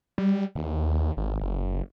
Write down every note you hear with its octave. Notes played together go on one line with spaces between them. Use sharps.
G3
D#2
G#1
F#1